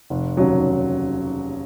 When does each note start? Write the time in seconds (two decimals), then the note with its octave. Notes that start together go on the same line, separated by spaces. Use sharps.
0.10 F1
0.37 D#2 C#3 F#3